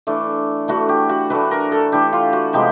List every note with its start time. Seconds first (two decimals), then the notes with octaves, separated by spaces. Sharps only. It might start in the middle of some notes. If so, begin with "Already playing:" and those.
0.07 E3 A3 D4
0.68 E3 A3 D4 F#4
0.89 G4
1.09 F#4
1.30 E3 A3 D4 B4
1.51 A#4
1.72 A4
1.92 E3 A3 D4 G4
2.13 F4
2.33 F#4
2.53 C3 F3 G#3 B3 G4